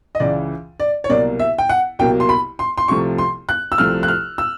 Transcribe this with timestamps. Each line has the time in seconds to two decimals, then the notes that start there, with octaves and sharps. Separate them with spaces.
0.15 D#5
0.20 C#2 C#3 E3 D5
0.80 D5
1.04 C#5
1.09 C2 B2 F#3 A#3 D5
1.39 E5
1.58 G5
1.69 F#5
1.99 C2 B2 F#3 A#3 G5
2.20 C6
2.29 B5
2.59 C6
2.78 C6
2.88 C2 C3 F3 A3 C#6
3.18 C6
3.49 F#6
3.72 E6
3.78 C2 C3 F3 A3 F6
4.03 F#6
4.08 F6
4.38 E6